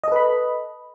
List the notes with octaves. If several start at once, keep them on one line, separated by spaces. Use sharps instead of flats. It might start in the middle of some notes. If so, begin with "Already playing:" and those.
A4 B4 D#5 B5